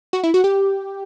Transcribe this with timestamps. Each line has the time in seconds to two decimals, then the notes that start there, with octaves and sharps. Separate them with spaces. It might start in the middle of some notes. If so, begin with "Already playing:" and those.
0.13 F#4
0.23 E4
0.34 F#4
0.44 G4